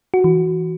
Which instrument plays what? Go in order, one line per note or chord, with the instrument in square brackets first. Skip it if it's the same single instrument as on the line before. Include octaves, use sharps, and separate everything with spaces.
[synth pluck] F#4
E3